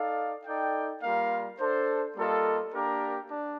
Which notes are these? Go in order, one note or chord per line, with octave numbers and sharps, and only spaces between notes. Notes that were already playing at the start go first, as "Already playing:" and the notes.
Already playing: D#4 A4 D5 F5
D#4 A4 D5 G5
G3 A#3 F4 A#4 F5
D4 A4 C5
G3 A#3 F4 A4 D#5
A#3 D4 G4 A#4
D4